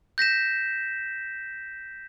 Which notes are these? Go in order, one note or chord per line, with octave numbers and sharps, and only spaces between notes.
G6 A#6 B6 E7